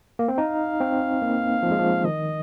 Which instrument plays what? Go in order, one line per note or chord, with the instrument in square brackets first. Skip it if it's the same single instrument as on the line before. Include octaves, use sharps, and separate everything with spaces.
[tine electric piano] A#3
C4
[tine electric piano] D#4 [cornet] F5
[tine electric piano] C4
A#3
F3
G#3
F3
[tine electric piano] D#3 [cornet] D#5